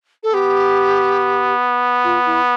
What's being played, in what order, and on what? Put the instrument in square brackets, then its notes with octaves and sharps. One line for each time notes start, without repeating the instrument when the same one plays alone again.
[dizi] A4
[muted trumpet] B3 [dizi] G4
[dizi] F4
E4